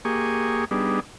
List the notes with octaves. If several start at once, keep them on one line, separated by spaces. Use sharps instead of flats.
A#3 G4 G#4 G#5 C#6 D#6
G3 B3 D4 D#4 G#4